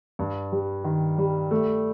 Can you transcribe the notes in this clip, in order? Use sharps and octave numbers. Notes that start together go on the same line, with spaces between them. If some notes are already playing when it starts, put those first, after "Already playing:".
G2
G3
D#3
G3
A3